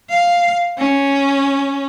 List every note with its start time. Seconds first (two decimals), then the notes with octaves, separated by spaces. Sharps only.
0.10 F5
0.78 C#4